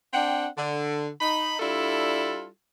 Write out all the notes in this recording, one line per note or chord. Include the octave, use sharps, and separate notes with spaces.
C4 D4 F#5 G5
D3
D#4 B5
G3 D4 E4 F4 A4